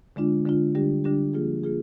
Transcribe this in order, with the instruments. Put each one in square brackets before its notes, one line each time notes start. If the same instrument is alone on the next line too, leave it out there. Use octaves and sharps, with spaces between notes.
[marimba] D3 G#3 D4 F4
D3 G#3 D4 F4
D3 G3 D4 G4
D3 G3 D4 G4
F3 A#3 F4 G#4
A#3 F4 G#4